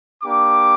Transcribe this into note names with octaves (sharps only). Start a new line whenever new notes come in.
A#3 D4 G4 D6